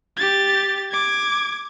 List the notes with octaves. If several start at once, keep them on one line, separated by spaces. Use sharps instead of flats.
G4 A6
D6 G#6